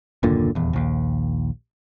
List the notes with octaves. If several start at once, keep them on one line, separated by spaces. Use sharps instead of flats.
F#1 D#2 A#2 D3
D#1 E2
A#1 D#2